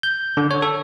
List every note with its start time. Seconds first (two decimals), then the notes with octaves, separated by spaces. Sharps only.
0.03 G6
0.37 D3
0.51 C#5
0.62 A4